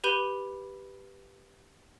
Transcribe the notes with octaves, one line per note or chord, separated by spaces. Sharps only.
G4 B4 B5 G6 D#7 G7